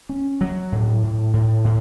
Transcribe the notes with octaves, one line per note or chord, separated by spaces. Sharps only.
C#4
F#3
A2
A2
A2
A2